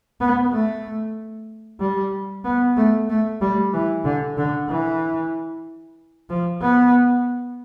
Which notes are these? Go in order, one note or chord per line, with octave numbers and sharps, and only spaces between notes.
B3
A3
G3
B3
A3
A3
G3
E3
D3
D3
E3
F3
B3